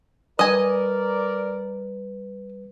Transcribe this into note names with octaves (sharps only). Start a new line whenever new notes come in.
G3 A#4 B4 D5 D#5 G#5